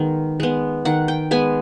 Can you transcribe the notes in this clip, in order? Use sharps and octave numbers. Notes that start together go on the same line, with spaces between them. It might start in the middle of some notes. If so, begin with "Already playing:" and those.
Already playing: D#3 G#3 B3
G#3 B3
D#3 F#5
G5
G#3 B3 G#5